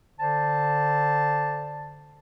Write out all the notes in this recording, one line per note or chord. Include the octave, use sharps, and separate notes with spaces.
D3 C5 D5 A5